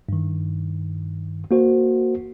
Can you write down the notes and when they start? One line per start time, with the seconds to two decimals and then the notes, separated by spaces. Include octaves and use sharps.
0.09 G2 D#3
1.51 A#3 F#4 C5